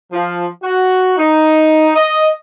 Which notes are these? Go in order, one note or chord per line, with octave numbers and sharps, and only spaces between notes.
F3
F#4
D#4
D#5